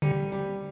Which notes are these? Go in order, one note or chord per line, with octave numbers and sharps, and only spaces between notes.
D3 G3
G3